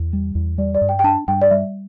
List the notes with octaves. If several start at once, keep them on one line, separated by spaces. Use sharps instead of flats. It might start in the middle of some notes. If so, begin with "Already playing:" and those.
Already playing: E2
G3
E2
G3 D5
D5
G2
G5
G5
D4 A5
G2 G5
D5
G3 E5